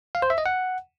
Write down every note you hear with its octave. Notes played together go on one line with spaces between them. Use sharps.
F5
C5
E5
D#5
F#5